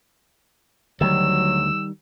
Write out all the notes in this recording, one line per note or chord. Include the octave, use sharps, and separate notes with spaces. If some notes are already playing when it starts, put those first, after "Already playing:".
D2 D#3 F#3 G3 E6